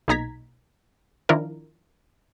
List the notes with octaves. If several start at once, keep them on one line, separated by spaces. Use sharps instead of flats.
B1 A#2 D#4 A#5 G#6 B6
D#3 F3 D4 E4 F4 A#4